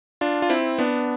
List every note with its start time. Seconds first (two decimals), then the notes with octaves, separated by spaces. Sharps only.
0.21 D4 F4
0.42 F4
0.50 C4 E4
0.78 B3 D4